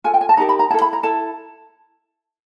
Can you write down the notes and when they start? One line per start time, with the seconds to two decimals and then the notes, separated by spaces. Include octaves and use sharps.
0.04 F4 A4 G#5
0.14 G5
0.21 G#5
0.29 A5
0.37 D#4 G4 A#4 A#5
0.49 B5
0.59 A#5
0.70 E4 A5
0.74 A4
0.82 B5
0.93 A#5
1.03 E4 A4 A5